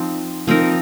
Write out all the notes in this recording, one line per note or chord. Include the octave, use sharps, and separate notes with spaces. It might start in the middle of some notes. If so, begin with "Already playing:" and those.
Already playing: F3 C4 D#4
F3 C4 D#4 A#4